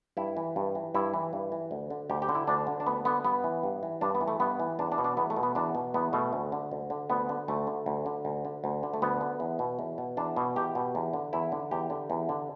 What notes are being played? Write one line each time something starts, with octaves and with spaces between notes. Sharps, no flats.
G2 E4
E3
G2
E3
G2 E4
E3
G2
E3
D2
D3
D2 G4
G4
D3
E4
D2 D4
D3
D4
D2 B3
D3 B3
G2 B3
E3
G2
E3
G2 D4
B3
E3
A3
G2 B3
E3
E2 D4
D4
B2
D4
E2 B3
A3
B2
B3
E2 D4
B2
E2 B3
B2 A3
D2
D3
D2
D3
D2 B3
D3
D2 A3
D3
D2
D3
D2
D3
D2
D3
A3
D2 B3
D3
E2
B2
E2
B2
E2 D4
B2
E2 G4
B2
E2
D3
E2 E4
D3
E2 G4
D3
E2
D3